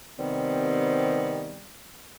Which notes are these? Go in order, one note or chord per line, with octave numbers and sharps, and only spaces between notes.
C3 D#3 G3 B3 C4